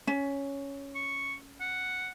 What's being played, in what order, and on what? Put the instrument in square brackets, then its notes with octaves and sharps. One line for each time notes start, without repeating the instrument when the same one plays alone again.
[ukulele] C#4
[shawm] C#6
F#5